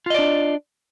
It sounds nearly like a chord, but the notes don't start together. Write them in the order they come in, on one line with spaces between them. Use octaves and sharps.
F4 D#5 D5 D4